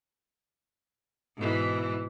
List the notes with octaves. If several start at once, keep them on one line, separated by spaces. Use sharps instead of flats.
G#2 B2 E3